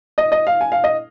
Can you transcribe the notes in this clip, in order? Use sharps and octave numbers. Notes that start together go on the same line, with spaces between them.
D#5
D#5
F5
G#5
F5
D#5